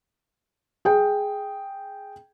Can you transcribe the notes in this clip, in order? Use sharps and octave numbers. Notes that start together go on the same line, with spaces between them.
G#4 G5